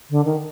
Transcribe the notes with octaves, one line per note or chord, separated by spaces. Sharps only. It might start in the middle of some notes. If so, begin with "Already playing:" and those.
D3
D#3